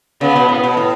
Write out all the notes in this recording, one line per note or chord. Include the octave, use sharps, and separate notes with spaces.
C#3 B3
B2
A2
B2
A2